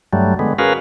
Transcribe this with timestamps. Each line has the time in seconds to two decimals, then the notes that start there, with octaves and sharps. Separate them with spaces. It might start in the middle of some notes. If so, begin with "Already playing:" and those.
0.13 G2 F#3 G3 A3
0.39 D3 G#3 B3
0.59 C#4 F#4 G#4 A#4 B4 F5